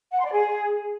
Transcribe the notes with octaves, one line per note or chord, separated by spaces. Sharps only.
F#5
C6
D5
G#4